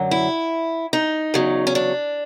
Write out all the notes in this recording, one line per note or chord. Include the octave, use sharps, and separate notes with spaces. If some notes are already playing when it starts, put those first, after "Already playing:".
Already playing: F#2 D3 F#3
E4
D#4
E2 C#3 F#3
C#4
D4